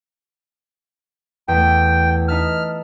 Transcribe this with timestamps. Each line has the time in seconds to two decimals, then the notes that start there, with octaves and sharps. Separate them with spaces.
1.48 E2 A3 G5
2.28 D#4 E5 A5 F6